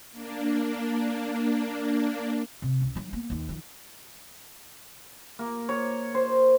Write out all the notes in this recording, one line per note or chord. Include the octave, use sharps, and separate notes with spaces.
A#3 D4
C3
C#2
F#3 D4
A#3 B3
D#2 A#3
D#3 F3
A#3
C#5
C5